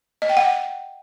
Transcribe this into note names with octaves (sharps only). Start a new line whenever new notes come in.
D#5
G5
F#5